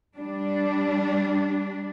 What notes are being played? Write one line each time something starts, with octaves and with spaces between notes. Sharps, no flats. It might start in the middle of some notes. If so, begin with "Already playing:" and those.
G3 D4